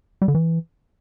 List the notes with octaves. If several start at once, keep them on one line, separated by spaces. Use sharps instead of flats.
G3
D3
E3